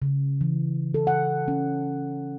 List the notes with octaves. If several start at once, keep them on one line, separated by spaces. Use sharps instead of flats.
C#3
E3
A4
F#5
C#4